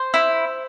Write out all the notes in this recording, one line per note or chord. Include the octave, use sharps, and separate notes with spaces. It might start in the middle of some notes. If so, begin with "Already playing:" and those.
Already playing: C5
E4